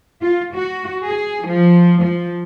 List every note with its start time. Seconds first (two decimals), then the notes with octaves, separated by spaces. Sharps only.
0.21 F4
0.53 F#4
1.05 G#4
1.46 F3
2.01 F3